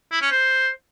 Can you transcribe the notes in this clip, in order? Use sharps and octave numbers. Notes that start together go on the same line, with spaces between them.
E4
C#4
C5